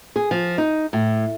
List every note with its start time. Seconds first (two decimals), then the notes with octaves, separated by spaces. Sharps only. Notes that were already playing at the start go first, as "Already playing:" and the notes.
0.16 G#4
0.31 F3
0.58 D#4
0.93 A2